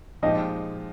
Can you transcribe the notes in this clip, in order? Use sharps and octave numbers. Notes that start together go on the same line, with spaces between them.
A#2 F3 G#3 D#4 G4 D#5